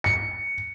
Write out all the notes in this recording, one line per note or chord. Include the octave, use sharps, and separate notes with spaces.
C#7